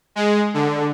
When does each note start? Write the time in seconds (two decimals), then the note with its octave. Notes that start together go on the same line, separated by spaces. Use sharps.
0.16 G#3
0.54 D3